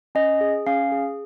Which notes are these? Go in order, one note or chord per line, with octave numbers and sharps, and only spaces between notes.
C#4 D#5
G#4
C#4 F5
G#4